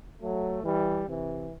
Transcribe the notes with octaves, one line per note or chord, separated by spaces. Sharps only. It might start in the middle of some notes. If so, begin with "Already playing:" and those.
F#3 A3
E3 G3
C3 E3